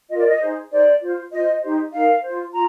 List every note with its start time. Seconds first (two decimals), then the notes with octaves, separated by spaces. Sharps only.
0.09 F4 D#5
0.14 A#4 D5
0.27 D#5
0.41 D#4 G#4 C5
0.71 D#4 G#4 C5 D5
1.01 F4 C5
1.31 F4 C5 D#5
1.61 D#4 G4 C5
1.92 D#4 A#4 F5
2.22 F4 C5
2.52 F4 A#5